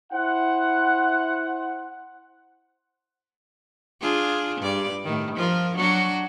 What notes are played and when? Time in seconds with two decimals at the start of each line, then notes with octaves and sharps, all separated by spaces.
0.13 E4 C5 F#5
4.01 D4 F4 G#4
4.61 G2 D5
5.04 A2 D#3
5.35 F3 F4 A#4
5.76 F#3 D4 F#4